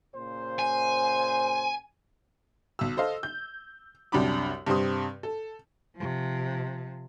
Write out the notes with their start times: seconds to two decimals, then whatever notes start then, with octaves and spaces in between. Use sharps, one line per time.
0.15 A#2 C#3 C5
0.59 G#5
2.79 B1 E6
2.97 A4 C5 D#5 F5
3.23 G6
4.12 C2 F#2 D4 G4 B5 D6
4.66 G2 C3 C4 G4 C6 D#6
5.23 A4
5.96 C3 F3